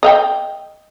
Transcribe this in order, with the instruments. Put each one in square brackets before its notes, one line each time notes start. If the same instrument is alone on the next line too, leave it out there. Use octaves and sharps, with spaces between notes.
[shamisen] D#5 F5 G5